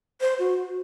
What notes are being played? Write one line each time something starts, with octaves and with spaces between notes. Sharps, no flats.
C5
F#4